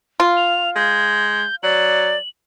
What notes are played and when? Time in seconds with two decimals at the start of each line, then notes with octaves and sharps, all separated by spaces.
0.20 F4
0.37 F7
0.75 G#3 G6
1.63 F#3 D5 F#7